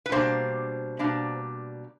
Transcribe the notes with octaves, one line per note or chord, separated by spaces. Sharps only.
B4
B2 G3 A#3 D4 C5
B2 G3 A#3 D4